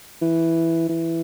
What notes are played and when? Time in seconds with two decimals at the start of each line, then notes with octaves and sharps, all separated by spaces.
0.22 E3
0.89 E3